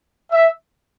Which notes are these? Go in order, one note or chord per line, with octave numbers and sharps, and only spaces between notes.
E5